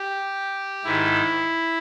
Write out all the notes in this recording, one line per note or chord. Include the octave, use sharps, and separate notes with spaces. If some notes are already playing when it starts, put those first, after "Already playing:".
Already playing: G4
G#2 D#3 E4